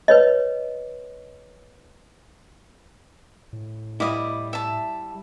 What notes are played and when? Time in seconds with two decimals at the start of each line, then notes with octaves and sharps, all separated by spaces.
0.08 B4 C#5 D#5
3.53 A2
4.00 G3 E4 D#5 F5 D6
4.53 E5 A5